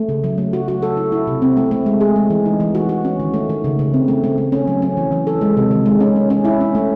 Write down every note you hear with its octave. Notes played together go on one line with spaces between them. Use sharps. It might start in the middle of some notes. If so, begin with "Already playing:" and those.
Already playing: A3
C#3
F#3
A3
F#4
F#4
A4
E4
E4
C3
C4
A3
A3
G#3
G#4
G#3
E3
D#4
E3
F#4
F#4
C#4
D#3
A3
D#3
C#3
C#3
C4
A3
A3
A3
C#4
F#3
C#4
E3
E3
A4
G#3
C3
D#3
G#3
C#4
C#4
C#4
E4
C#4
A3